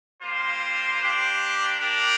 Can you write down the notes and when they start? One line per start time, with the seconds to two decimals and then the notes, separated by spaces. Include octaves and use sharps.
0.22 G3 A#3 F4 C5
1.01 A#3 D4 G4
1.78 A#3 D4 G4 A#4